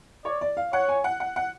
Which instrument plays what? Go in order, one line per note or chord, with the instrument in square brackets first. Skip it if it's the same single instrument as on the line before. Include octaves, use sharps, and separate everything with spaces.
[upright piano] C#5 [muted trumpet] D5
[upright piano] D5
F5
[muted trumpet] C#5 [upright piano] F#5
[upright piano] G#5
F#5
F#5
F#5